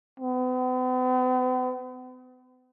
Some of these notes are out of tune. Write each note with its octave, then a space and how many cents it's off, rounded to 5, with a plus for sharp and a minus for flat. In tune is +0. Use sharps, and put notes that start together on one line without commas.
B3 +45